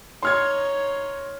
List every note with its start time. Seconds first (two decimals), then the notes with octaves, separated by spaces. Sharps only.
0.23 D#4 C#5 C6 F6 G#6